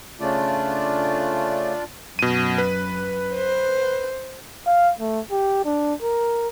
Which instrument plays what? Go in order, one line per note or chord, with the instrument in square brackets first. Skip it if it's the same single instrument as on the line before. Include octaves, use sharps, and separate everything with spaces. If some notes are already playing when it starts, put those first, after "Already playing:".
[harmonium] C#3 A3 [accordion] D4 F4 D5
[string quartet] F#2 [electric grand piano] B2 D#7
[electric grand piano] B4
[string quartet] C5
[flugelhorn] F5
A3
G4
D4
A#4